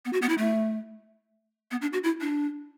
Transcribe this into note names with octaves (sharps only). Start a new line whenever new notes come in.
B3
F#4
B3
E4
A3
B3
D4
F#4
E4
D4